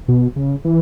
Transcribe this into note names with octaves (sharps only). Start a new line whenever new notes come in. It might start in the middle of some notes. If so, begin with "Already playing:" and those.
B2
C#3
E3